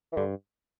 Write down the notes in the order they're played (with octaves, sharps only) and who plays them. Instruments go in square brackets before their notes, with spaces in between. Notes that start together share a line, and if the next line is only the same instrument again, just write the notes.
[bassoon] E3
[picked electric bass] G2 [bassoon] D3